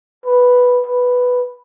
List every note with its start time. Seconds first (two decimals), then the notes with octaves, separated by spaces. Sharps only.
0.26 B4
0.87 B4